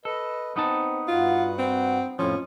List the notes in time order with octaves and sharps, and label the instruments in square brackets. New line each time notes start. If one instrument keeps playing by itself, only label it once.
[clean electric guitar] A4 [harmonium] B4 D#5
[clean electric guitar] B3 D#4 A5 [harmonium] C4
[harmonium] G2 F#4 F#5 [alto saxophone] F4
[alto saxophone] C4
[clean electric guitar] F2 A2 F3 [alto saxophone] C#4